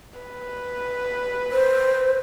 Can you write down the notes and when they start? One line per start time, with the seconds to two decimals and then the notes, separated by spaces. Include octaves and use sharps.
0.19 B4
1.51 C5